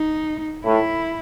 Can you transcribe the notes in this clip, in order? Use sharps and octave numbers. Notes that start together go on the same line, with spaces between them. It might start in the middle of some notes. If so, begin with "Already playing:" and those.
Already playing: D#4
A2 E4